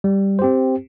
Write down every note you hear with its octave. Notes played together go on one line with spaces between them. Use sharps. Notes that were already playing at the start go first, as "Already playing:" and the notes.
G3
C4 G4 C5